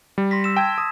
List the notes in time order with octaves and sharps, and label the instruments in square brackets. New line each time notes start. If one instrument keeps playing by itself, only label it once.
[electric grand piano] G3
[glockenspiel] C6 A#6 B6
E6 E7
[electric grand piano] G5 [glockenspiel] A5 E6 G#6
[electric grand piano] D#6